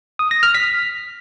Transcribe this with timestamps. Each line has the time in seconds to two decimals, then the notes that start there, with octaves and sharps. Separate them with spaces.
0.19 D#6
0.31 A#6
0.43 F6
0.55 B6